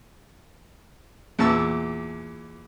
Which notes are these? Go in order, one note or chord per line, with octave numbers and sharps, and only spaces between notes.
E2 A#2 A5 C#6 E6